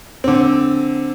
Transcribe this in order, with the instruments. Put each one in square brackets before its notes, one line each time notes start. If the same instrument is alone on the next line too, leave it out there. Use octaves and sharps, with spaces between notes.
[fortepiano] D3 C4